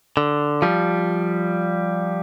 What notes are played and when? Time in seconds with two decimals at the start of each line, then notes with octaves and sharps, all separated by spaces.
0.17 D3
0.62 F3 G3